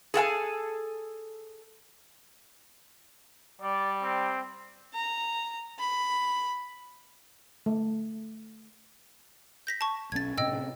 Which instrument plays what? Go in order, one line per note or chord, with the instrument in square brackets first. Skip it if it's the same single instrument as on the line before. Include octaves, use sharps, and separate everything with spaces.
[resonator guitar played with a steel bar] G#4 A4 F#5 G#5
[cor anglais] G3 [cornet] D5
[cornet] C4
[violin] A#5
B5
[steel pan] A3
[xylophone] G6 A#6 B6
A5 C#6
[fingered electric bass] B1 C#4 [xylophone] G#6 A6
[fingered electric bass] A2 C3 C#4 [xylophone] D#5 G5 E6